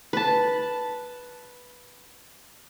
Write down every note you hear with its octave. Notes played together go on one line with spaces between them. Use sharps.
B4 A5